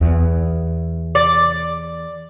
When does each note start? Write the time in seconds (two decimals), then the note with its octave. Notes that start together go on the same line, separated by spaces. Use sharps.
0.01 E2
1.15 D5